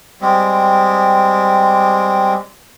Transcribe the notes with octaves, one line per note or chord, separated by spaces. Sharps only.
G3 G#3 C4